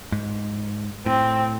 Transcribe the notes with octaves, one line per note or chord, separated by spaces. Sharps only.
G#2
A2 C4